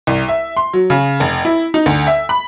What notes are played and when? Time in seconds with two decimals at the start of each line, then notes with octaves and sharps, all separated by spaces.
0.07 C2
0.28 E5
0.57 C6
0.73 F#3
0.90 C#3
1.20 F1
1.45 E4
1.74 D#4
1.86 D2
2.07 E5
2.29 B5